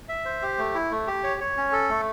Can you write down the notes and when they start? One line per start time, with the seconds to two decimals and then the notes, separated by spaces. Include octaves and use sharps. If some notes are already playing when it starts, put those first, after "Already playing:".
0.09 E5
0.25 C5
0.42 G4
0.58 A3
0.75 E4
0.91 A3
1.07 G4
1.24 C#5
1.41 C#5
1.57 C#4
1.72 A4
1.89 A3